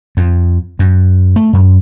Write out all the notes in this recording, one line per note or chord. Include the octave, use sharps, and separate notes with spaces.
F2
F#2
A3
F#2